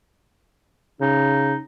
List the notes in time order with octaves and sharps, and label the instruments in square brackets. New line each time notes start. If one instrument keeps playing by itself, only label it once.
[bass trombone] C#3 [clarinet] D#4